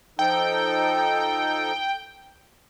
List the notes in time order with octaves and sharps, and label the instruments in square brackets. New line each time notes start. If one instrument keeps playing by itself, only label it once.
[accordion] F3 D#4 A4 [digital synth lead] G5